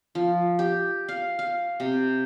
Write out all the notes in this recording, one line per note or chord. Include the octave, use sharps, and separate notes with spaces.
F3
G4
F5
F5
C3